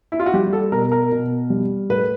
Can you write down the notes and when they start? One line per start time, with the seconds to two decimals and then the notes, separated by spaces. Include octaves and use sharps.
0.12 E4
0.19 F4
0.26 F#4
0.34 G3 G4
0.53 A4
0.72 B2 A#4
0.92 A#4
1.12 B2
1.50 G3
1.89 A2 B4